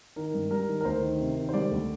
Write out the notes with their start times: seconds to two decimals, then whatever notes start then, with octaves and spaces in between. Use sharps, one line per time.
0.16 D#3 A#4
0.34 G2
0.51 G3 A#4
0.68 D#3
0.81 A#4
0.85 D2 C5
1.02 D#3
1.20 C3
1.36 D#3
1.49 C5
1.54 G3 D5
1.71 D2